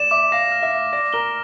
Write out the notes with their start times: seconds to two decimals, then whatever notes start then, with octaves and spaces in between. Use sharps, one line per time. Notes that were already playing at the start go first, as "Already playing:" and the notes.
Already playing: D5 E7
0.11 E5 D6
0.32 F5 A#6
0.52 F6
0.63 E5
0.72 E7
0.93 D5 A#6
1.13 A#4 G7